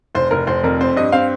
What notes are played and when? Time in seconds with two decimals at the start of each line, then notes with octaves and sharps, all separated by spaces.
0.15 F1 C5
0.31 F1 A#4
0.47 F1 C5
0.63 F2 A#4
0.80 C4 C5
0.96 G2 D#5
1.12 C4 F5